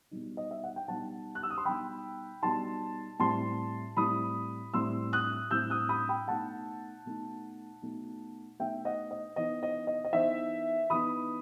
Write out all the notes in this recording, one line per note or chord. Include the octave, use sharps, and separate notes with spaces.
B2 G3 D#4
D#5
E5
F#5
G5
B2 G3 D#4 F#5 A5
F#6
E6
D#6
C6
B2 G3 D#4 G5 B5
B2 G3 D#4 A5 C6
A2 G3 C4 E4 A5 C6
A2 G3 C4 E4 B5 D#6
A2 G3 C4 E4 C6 E6
D#6 F#6
A2 G3 C4 E4 E6 G6
D#6 F#6
B5 D#6
G5 B5
B2 A3 D#4 F#5 A5
B2 A3 D#4
B2 A3 D#4
B2 A3 D#4 E5 G5
D#5 F#5
D#5
E3 B3 D#4 D#5
D#5
D#5
D#5
E3 B3 D#4 C5 E5
E3 B3 D#4 B5 D#6